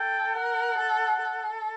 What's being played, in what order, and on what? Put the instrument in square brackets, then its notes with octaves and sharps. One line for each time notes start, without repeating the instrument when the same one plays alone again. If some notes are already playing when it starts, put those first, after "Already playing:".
Already playing: [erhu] A4 [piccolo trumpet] G5
[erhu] A#4 [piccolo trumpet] F#5
[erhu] A4
A4